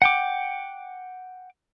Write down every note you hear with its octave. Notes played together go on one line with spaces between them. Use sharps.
F#5 G5 D6